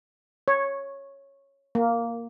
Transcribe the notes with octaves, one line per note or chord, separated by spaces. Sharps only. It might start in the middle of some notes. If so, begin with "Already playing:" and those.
C#5
A#3